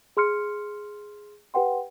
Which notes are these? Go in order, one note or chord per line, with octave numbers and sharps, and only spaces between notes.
G#4 C6 F6 C#7
G4 B4 F#5 G5 C6